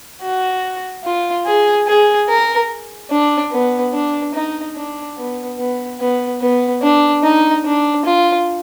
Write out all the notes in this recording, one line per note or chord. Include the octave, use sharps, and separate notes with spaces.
F#4
F4
G#4
G#4
A#4
D4
B3
D4
D#4
D4
B3
B3
B3
B3
D4
D#4
D4
F4